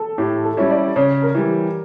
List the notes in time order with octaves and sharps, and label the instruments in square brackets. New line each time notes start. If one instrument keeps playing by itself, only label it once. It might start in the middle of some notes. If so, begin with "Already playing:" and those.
Already playing: [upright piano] A4
[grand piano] A2 [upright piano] G4
[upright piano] A4
[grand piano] G3 C#4 E4
[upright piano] D5
[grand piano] C#3 [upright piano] C#5
[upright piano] A#4
[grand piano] E3 G3
[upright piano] G4